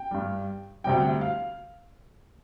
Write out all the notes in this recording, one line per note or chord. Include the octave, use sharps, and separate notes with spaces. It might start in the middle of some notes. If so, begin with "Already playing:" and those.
Already playing: G5
G2 G3
D2 C3 G3 G5
F5